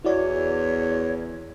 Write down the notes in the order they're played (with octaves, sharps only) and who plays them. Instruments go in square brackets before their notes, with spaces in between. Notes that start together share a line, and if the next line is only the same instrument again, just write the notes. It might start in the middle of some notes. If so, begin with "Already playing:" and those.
[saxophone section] E2 [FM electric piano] E4 F#4 D5 [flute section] C#5